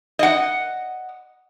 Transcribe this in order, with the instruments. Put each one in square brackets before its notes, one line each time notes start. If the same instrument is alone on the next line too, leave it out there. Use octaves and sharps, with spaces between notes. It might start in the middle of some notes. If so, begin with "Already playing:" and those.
[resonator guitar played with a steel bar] D#5 F#5